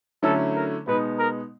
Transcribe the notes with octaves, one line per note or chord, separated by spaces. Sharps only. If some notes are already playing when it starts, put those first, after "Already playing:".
D3 F#3 A3 C#4 E4 A4
A#4
B2 G#3 B3 D#4 B4
A#4